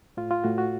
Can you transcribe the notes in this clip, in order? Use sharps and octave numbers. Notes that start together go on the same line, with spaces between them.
A2 F4
F4
A2 F#4
F#4